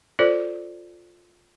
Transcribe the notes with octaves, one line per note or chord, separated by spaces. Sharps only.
F4 A4 C5 D5